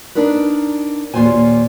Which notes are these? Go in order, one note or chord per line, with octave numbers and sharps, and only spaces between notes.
D4 D#4 A#4 B4
D#2 A#2 F#3 F4 C5 G#5